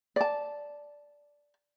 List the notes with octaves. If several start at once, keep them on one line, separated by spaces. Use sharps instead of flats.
D5 A5